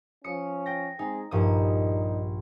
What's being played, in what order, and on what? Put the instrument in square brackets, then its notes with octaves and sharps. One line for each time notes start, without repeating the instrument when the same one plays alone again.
[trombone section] F3 C#4 [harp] D#6 C#7
[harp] G5 A#6
[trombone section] G#3 C4 G#4 [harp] D#4
[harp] A#1 G2 D#6 [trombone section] G3 D#4